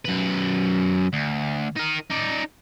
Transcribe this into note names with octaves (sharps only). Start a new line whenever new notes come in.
F#2 B4
D2
D#4 A#4
D#4 D5